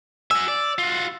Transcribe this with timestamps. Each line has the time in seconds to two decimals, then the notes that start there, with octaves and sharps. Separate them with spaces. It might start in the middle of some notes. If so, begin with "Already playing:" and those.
0.31 F#4 G#5 E6
0.48 D5
0.78 F4 F#4